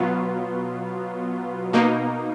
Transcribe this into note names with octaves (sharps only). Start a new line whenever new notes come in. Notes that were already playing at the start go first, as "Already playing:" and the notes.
Already playing: B2 F#3 B3 F4
B2 A#3 D#4